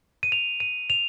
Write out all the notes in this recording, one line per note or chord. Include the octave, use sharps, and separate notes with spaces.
D#7
F7
D#7
F7